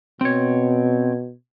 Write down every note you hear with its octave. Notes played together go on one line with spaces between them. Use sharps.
B2 C4 C#5